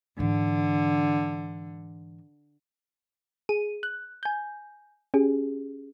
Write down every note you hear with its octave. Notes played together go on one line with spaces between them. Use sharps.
G#2 D3 E3
G#4 D#7
F#6
G#5 G6
C#4 G4 G#4